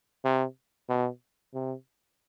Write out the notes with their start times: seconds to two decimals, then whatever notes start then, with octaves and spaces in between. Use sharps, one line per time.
0.24 C3
0.89 B2
1.54 C3